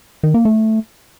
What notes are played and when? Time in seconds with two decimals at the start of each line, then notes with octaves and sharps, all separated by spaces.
0.23 D#3
0.34 A#3
0.45 A3